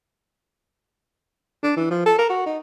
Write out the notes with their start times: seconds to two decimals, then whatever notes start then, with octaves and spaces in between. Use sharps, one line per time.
1.63 D4
1.76 E3
1.90 F3
2.06 A4
2.18 A#4
2.30 F#4
2.46 D#4